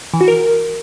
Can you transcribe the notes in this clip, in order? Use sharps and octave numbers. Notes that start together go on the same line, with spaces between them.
E3
F#4
A#4